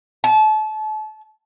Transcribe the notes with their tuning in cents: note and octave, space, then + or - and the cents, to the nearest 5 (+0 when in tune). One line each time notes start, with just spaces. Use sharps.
A5 -35